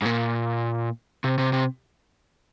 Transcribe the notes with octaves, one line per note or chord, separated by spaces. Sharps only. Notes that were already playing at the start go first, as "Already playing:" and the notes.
G#2
A#2
C3
C3
C3